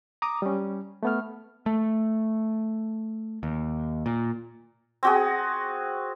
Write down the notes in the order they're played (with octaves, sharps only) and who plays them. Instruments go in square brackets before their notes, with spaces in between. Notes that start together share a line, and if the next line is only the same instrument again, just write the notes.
[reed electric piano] A#5 D6 D#6
G3 C#4
A3 B3 F6
[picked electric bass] A3
D#2
A#2
[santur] C4 F#4 G#4